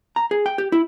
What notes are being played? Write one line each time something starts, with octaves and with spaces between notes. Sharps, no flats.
A#5
G#4
G5
G4
E4